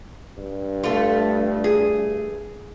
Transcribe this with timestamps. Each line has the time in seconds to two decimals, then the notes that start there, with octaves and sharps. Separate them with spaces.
0.38 G2
0.84 A3 F4
1.64 G#4